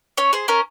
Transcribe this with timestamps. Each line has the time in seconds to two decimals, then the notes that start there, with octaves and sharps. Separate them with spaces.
0.18 C#4 C#5
0.33 G#4 C5
0.48 C#4 A#4